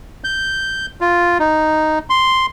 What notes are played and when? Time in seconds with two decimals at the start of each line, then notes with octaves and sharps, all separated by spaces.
0.24 G6
1.01 F4
1.39 D#4
2.10 C6